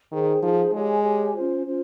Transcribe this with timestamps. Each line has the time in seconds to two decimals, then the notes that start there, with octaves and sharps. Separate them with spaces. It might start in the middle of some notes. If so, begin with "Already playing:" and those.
0.11 D#3 D#4 G#4 C5
0.42 F3 D#4 G#4 C5
0.72 G#3 G4 C#5 G#5
1.03 G4 C#5 G#5
1.34 C#4 F4 C5
1.65 C#4 F4 C5